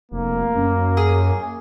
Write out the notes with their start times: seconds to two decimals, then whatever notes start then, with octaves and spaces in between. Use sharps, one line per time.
0.12 F1 A#3
0.56 F#2
0.97 G#4